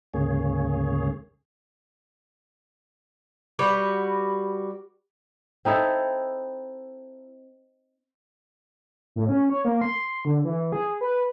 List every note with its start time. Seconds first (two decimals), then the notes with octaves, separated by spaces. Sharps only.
0.14 D2 G#2 C#3 A#3 G#4 C#5
3.59 G3 F#4 B4
5.65 C4 D#4 E4 A4
9.16 A2
9.29 C#4
9.50 C#5
9.65 A#3
9.82 C6
10.25 D3
10.45 E3
10.72 G#4
11.01 B4